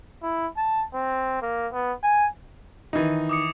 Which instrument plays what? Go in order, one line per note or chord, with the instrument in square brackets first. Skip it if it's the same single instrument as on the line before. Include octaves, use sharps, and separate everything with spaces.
[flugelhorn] E4
A5
C4
A#3
B3
G#5
[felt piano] D#3 [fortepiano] E3 D#4
[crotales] D6 D#6 C#7